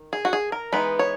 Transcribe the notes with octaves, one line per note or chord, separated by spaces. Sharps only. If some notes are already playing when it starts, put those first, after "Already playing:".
Already playing: D#3
G#4
F#4
G#4
A#4
E3 G#3 B3 D#4 B4
C#5